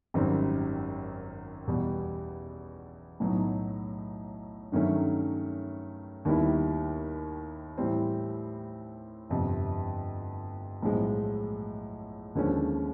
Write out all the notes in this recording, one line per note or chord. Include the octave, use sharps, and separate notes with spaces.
G#1 F#2 D#3 G3 C4
E2 B2 G3
B1 A2 F#3 B3 D#4
G2 D#3 F#3 A3 C#4
D#2 D#3 G3 B3 E4
A2 E3 G3 C4
G1 F2 C3
B1 A2 F3 G#3
D#2 D3 F3 G#3 C#4